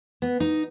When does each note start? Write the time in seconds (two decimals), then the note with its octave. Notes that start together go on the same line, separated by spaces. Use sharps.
0.22 B3
0.40 D#4